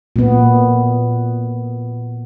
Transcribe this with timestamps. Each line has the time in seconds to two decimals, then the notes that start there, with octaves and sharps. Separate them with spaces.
0.16 A#2 B3